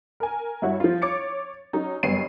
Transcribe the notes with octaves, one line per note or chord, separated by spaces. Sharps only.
A#4 G#5
G2 E4 F#4 C#5
F3 F4
C#5 D6 A6 C#7
F#3 C#4 D#4
F#1 G2 B3 C#5 C7 D#7